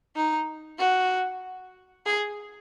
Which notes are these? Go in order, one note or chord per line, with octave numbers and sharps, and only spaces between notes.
D#4
F#4
G#4